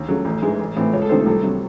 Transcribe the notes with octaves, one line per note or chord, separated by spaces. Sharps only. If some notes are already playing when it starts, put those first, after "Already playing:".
Already playing: D#2
C#3 F#3 A3
A1
G#2 E3 G#3
A1
A2 E3 C4
C#2 C#5
A4
C3 D#3 A3 C5
C2 A4
C3 F#3